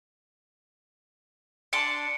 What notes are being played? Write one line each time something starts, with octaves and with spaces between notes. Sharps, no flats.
D4 A5 C6 C#7 D7